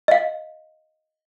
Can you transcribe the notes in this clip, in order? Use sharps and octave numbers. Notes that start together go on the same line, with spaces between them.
D#5 F5